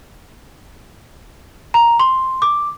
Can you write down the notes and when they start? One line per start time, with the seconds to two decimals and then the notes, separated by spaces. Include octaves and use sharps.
1.74 A#5
2.00 C6
2.42 D6